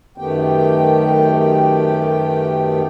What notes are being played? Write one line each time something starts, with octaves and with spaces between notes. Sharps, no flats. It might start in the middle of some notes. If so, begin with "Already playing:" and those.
F#2 D#3 A3 B3 G4 G5